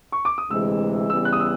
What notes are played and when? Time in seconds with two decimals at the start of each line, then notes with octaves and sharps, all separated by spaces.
0.12 C#6
0.25 D6
0.38 D#6
0.50 D2 C3 E3 G#3 E6
1.10 C#3 E3 G3 B3 E6
1.25 F#6
1.33 D#6
1.40 E6